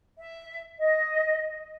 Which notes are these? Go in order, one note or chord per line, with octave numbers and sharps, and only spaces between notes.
E5
D#5